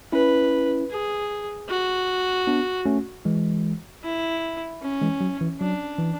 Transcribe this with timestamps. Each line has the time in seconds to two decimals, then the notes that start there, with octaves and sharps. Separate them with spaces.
0.12 C#4 E4 B4
0.91 G#4
1.69 F#4
2.47 B3 D4
2.86 A3 C#4
3.25 E3 G#3
4.04 E4
4.82 C#4
5.01 E3 G#3
5.21 F#3
5.41 E3
5.60 F#3 D4
5.98 E3